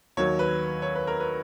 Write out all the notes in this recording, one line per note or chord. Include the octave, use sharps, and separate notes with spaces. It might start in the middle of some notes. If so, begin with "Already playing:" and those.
D#2 D#3 F#3 C#5
B4
C#5
B4
A#4
B4